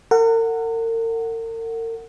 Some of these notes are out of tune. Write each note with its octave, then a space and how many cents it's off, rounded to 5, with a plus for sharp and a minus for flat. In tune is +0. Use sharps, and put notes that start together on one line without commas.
A#4 -40 F#5 +0